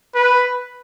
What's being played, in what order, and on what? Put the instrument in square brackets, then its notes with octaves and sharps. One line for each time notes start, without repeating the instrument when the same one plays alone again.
[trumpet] B4